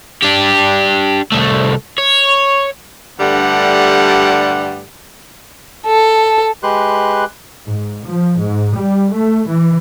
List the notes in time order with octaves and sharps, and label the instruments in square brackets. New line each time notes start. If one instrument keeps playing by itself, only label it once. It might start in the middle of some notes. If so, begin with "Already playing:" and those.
[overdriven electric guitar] D4 G4
C2 A3
C#5
[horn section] G2 D3 G3 A3 F#5
[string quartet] A4
[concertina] G#3 G4 B4 C6 F#6
[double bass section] G#2
F3
G#2
G3
A3
E3